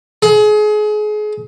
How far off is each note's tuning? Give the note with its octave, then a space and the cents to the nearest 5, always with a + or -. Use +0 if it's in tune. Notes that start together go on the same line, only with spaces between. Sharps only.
G#4 +30